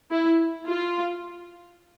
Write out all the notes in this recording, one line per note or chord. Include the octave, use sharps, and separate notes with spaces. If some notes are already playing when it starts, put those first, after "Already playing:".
E4
F4